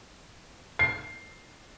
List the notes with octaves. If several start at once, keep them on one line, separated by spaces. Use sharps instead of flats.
C7